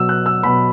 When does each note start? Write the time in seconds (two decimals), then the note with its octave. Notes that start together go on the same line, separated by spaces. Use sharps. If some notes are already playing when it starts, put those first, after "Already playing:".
Already playing: B2 F#3 E6
0.09 F#6
0.26 E6
0.43 B2 F#3 B5